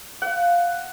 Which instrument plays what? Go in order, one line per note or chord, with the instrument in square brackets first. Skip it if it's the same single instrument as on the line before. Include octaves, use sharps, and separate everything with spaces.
[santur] F5 F#5